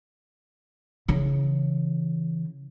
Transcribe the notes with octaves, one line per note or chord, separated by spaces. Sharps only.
C#3 E3